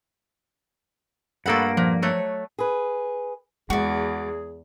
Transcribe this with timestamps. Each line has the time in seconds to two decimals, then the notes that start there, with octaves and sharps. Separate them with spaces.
1.46 G2 A3 A#3 A4 F#5 B5
1.77 A#2 F3
2.02 F#3 A3 C#5
2.58 G#4 B4
3.70 E2 G#3 F#4 G#4 D5